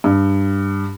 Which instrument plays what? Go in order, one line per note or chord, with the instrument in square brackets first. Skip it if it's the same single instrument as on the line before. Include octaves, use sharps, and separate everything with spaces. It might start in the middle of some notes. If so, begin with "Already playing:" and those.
[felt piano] G2